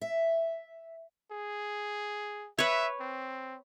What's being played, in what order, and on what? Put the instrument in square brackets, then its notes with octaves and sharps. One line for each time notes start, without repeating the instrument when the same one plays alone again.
[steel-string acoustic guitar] E5
[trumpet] G#4
[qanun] B4 C#5 [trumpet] E5
[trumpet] C4